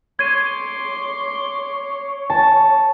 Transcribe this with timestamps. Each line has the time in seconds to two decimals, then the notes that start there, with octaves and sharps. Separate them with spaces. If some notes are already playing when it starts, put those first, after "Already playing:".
0.19 C#5 C6 D6 G#6 D#7
2.30 A5